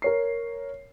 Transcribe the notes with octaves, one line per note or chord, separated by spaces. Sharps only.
A#4 C#5 C7